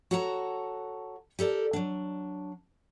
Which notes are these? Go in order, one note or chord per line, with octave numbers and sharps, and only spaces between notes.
F#4 A4 C#5 F#5 A5 A#5
G4 A4 A#4 D5
F#3 D4